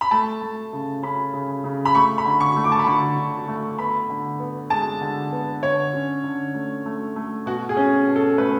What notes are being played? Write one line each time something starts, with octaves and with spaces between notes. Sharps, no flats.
B5
A3 A5
A3
C#3
C#4 B5
C#3
C#3
B5
A3 C#6
B5
D3
C#6
A3
D6
A5
B5
D3 C#6
D3
A3
B3 B5
D3
B3
G#3 A5
D3
B3
D3 C#5
C#4
D3
A3
A3
A3
B2 F#4
G#4
C#4
B2
A4
A3 B4